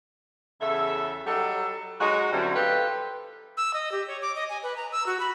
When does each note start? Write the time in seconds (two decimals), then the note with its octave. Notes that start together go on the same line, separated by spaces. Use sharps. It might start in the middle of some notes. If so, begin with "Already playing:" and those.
0.61 E2 C#3 A4 E5
1.27 F#3 G3 D#4 A4
2.01 F#3 G#3 D#4 F#4
2.32 F#2 D3 F#3 G3 C4 E4
2.56 F4 G4 A4 B4
3.57 E6
3.74 D#5
3.92 G4
4.08 C#5
4.22 D6
4.35 D#5
4.49 G#5
4.63 B4
4.76 A#5
4.92 E6
5.06 F#4
5.20 B5